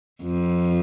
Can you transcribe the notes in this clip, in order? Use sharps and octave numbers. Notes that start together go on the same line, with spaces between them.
F2